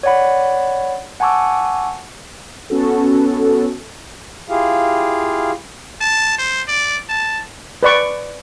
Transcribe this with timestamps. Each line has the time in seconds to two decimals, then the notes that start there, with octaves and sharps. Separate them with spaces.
0.03 C#5 D5 F#5 B5
1.20 F#5 G#5 A5 C#6 D6 E6
2.70 B3 C#4 F#4 A4
4.49 E4 F4 G4 G#4 F5
6.01 A5
6.38 C5
6.68 D5
7.09 A5
7.83 B4 D5 C#6